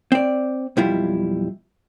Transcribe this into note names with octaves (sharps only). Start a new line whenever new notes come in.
C4 D5
B1 F2 G3 E4 F4